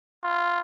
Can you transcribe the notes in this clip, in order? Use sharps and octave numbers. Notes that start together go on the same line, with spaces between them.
F4